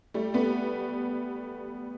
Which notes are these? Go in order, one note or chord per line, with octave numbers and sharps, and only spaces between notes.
G3 A3
A3 B3